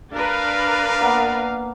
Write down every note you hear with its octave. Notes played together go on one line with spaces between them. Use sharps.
D4 A#4 B4 F5
A#3 B3